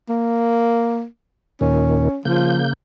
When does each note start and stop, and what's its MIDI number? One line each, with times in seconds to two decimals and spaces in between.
0.09 1.05 58
1.61 2.09 39
1.61 2.09 46
1.61 2.09 51
1.61 2.18 61
2.25 2.73 49
2.25 2.61 53
2.25 2.73 58
2.25 2.73 91